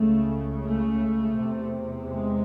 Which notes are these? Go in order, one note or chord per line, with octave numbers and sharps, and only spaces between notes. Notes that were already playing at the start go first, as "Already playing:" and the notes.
Already playing: C#2 C#3 A3
A3
E2 C3
G#3